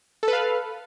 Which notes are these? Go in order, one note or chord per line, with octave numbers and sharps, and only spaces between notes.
A4 B4 F5